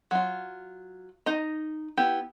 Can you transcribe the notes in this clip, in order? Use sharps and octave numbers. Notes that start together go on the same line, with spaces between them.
F#3 F4
D#4 D#5 A#5
B3 E4 G4